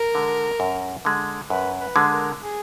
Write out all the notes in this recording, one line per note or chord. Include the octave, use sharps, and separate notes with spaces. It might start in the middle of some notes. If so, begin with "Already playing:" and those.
Already playing: A#4
D3 G#3
F#2
D3 G#3
F#2 B4
B4
D3 G#3
A#4
G#4